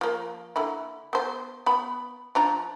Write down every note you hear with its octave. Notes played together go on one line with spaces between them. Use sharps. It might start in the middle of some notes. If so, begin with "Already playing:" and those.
F3 A#3
D3 A#3 E4
B3 C5
B3 B5
F3 D4 A#5